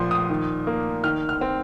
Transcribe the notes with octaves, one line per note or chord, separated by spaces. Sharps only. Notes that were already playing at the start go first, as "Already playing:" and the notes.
Already playing: A#2 F3 C6
D#6
D#3
A#3
D#3 F6
F6
C4